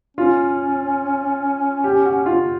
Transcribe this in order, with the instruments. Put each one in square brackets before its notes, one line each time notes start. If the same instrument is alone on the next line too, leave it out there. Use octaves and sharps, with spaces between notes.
[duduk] C#4 [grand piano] F4
[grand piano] G4
F#4
F4